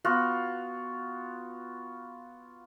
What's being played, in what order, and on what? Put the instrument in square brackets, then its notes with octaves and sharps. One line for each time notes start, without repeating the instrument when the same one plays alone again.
[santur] B3 F4 F#4